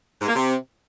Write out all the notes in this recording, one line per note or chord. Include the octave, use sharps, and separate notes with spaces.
G#2
A#3
C3